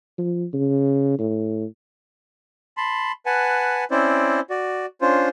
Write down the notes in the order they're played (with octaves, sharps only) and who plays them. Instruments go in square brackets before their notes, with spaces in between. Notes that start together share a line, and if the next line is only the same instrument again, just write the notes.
[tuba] F3
C#3
A2
[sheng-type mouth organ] A5 B5 C6
B4 F#5 G#5 A5
C4 C#4 E4 C5 D5
F#4 D5
C#4 D4 F4 C5